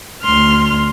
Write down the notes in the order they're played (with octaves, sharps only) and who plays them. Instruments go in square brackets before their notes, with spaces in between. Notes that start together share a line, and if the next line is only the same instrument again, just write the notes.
[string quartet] D2 C6 F6